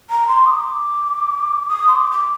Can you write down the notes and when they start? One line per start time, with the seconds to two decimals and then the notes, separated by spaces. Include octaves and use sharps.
0.10 A#5
0.28 C6
0.46 D#6
0.51 D6
1.69 D#6
1.88 C6
1.96 D6
2.12 D6